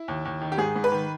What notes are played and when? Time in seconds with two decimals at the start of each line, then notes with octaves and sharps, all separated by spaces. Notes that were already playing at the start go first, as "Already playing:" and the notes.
Already playing: E4
0.08 D#2
0.25 D#2
0.42 D#3
0.52 G4
0.58 G#2 G#4
0.76 G#2
0.84 B4
0.92 D#3